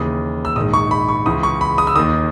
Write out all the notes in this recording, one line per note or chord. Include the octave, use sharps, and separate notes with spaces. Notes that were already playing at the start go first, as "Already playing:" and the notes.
Already playing: D#2 C#3 E3 D#6
E6
A#1 G#2 D#3 D#6
C#6
B5
C#6
C#2 C#3 E3 D#6
C#6
B5
D#6
E6
D#2 D#3 D#6